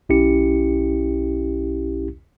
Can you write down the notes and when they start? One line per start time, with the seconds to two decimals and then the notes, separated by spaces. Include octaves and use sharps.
0.09 B1 C#4 E4 G4 C#7